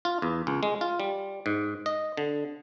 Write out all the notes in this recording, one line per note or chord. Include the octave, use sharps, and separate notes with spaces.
F4
E2
C#2
G#3
F4
G3
G#2
D#5
D3